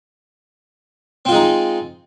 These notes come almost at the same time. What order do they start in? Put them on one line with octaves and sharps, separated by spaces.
C4 F4 G#3 D#4